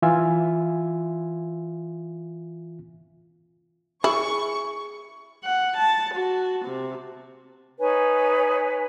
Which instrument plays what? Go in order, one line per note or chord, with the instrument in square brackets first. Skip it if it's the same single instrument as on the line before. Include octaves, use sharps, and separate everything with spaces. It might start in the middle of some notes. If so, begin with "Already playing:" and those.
[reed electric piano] E3 F4 E5 G#5
[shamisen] E4 [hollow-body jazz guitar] G#4 [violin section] C#6
[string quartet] F#5
A5
F#4
C3
[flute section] D#4 B4 C#5 G#5